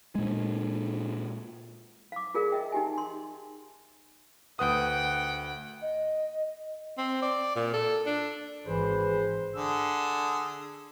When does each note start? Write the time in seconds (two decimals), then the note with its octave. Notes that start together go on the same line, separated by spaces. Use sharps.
0.15 A#2 G#3
2.12 F5 D6
2.34 F4 G#4 A#4 D5 F5
2.52 D#5 E5 G5
2.72 D#4 G4 G#5
2.98 C6
4.59 D2 B4 F#5 G5 D#6
5.82 D#5
6.98 C4
7.22 D5
7.56 A#2
7.73 A4
8.06 D4
8.66 G#1 E3 G#4 B4 C5
9.55 D3 G#4 E6